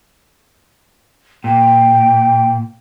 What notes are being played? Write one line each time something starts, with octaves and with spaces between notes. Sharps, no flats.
A#2 G5